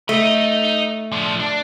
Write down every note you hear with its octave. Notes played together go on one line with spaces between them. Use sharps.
A3 D#4 D#5
F3 D4
D4